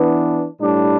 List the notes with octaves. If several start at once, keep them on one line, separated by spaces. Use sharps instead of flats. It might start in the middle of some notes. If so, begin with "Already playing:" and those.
Already playing: E3 B3 D4
A2 G3 D4